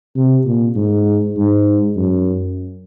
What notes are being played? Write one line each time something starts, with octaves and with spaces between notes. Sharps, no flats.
C3
A#2
G#2
G#2
F#2